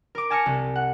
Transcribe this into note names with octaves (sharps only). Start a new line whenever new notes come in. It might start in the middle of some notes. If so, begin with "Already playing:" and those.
A#4 D6
G#5 A5 F6 A#6 C#7
C2
F#5